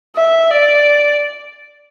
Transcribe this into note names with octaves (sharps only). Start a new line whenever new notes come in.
E5
D5